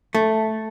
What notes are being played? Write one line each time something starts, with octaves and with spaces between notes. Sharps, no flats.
A3